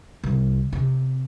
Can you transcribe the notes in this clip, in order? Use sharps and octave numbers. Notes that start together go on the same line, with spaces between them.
C2
C3